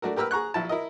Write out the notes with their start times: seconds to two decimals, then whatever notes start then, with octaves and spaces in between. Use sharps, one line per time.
0.02 A3 D4 F#4 A#4
0.16 G4 A#4 B4 E6 F6
0.31 G#4 A#5 C#6 F#6
0.54 A#1 E4 A5
0.69 E4 A#4 D#5